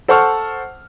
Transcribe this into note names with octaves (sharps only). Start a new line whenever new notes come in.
A4 C5 F#5 A5 C#6 F6